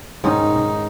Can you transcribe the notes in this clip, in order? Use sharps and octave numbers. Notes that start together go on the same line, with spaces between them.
G#2 D#3 C#4 D#4